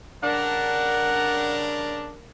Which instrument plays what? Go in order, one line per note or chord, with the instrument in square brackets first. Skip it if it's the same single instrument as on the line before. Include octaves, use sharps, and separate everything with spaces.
[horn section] G2 C#3 D4 [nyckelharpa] A#4 A#5 [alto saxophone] F#5